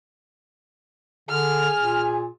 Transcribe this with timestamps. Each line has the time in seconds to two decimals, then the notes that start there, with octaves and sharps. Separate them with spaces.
1.29 D3 G#4 F6
1.79 A#2